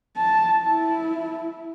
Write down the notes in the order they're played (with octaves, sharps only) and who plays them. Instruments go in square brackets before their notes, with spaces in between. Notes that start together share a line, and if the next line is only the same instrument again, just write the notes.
[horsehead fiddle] A5
E4